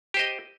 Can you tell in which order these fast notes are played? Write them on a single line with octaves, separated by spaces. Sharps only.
G4 C5 D#5